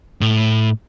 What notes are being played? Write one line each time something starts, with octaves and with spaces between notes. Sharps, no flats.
A2